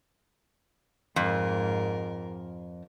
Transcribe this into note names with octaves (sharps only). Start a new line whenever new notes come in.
F2 G#2 A#4